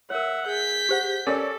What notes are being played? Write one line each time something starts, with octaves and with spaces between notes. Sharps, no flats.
A#4 C#5 E5 F#5
G#4 G6 B6
G4 C5 F#5
C#4 A4 A#4 D5